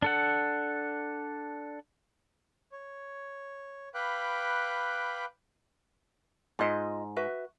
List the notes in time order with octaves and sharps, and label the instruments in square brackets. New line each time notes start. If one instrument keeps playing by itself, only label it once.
[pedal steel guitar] D4 A4 F#5
[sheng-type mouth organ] C#5
B4 F5 G5 B5 D6 F#6
[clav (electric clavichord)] G#2 [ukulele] F4 D#5
[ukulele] F#4 B4 E5